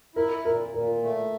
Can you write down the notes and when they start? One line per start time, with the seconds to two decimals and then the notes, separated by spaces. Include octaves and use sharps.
0.16 E4 A#4
0.45 A#2 A#4
0.74 A#2 A#4
1.03 A3